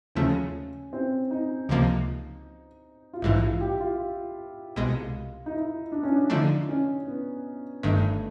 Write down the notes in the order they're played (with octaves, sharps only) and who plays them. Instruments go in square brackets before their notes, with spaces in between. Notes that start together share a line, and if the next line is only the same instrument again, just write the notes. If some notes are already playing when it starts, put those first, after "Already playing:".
[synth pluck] D#2 C#3 F3 A3 [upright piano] C#4
[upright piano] C4
D#4
[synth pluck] C#2 C3 F3 A#3
[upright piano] F4
[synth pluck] A#1 G#2 E3 [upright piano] E4
[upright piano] F4
G4
F4
[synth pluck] C2 B2 G#3
[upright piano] D#4
E4
D4
C#4
D4
[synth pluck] D3 F3 A3 D4 [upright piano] D#4
[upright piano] C#4
B3
[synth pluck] G1 G2 D#3 [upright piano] A3